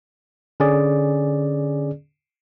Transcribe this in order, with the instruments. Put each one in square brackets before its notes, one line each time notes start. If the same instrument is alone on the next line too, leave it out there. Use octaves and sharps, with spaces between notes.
[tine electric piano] D3 C#4 G#4 D5